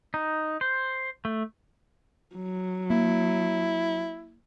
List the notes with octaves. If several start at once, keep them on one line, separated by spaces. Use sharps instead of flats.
D#4
C5
A3
F#3
A#3 E4